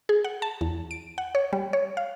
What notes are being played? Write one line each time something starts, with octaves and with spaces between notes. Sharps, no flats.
G#4
F#5
A5
E2
D7
F#5
C#5
G3
C#5
F5